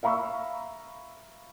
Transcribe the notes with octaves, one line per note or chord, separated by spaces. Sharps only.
E5 F5 A#5 B5 C#6 E6